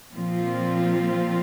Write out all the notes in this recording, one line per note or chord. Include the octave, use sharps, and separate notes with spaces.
A#2 F3 C4 F4